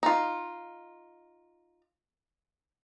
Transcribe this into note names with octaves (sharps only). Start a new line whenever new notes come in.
D#4 F4